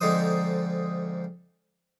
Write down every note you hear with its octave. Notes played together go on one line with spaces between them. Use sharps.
F2 G#2 D3 D#4 C5 D#6